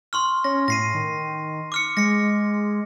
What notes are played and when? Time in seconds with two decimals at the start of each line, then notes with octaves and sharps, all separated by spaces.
0.13 C6 C#6 F6
0.44 C#4 A#6
0.68 A2 A#6 C7 D#7
0.94 D#3
1.72 D6 F6 C#7
1.97 G#3 A#6 C#7